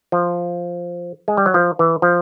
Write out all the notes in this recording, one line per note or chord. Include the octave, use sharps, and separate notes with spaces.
F3
G#3
G3
F#3
F3
E3
F3